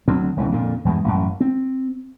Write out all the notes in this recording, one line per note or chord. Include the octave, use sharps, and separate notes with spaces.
D2 D3 F#3 C4
E1 C#2 E3
F2 A#2 D3
E2 G2 G#3
A1 F#2
C4